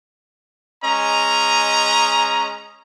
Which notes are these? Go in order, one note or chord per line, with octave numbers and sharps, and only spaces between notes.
G#3 C#4 D#5 A#5